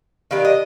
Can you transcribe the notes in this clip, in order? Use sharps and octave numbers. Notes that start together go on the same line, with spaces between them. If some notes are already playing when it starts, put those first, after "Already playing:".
D#3 G3 D4 F5
D#5